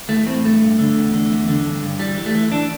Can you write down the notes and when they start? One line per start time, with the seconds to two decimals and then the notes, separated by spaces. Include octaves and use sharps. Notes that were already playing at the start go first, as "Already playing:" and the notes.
0.09 E3 A3
0.26 A2 C4
0.44 G2 A3
0.61 G2
0.79 D3
0.97 E2
1.13 D3
1.31 E2
1.48 D3
1.65 G2
1.83 G2
1.99 E3 G3
2.17 E3
2.26 A3
2.35 E3
2.51 E3 D4